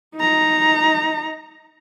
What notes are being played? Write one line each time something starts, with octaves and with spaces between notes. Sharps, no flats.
D#4 A#5